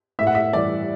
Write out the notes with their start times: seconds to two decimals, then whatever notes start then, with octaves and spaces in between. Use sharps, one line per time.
0.19 A2 E5
0.27 F#5
0.35 E5
0.53 E3 G3 D5